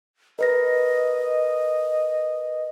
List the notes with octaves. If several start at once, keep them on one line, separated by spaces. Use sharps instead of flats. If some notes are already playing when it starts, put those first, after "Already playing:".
A#4 B4 D#5 A#6